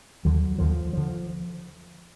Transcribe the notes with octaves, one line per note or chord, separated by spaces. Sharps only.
D#2 D3 F#3
D#2 D3 F3
D3 F3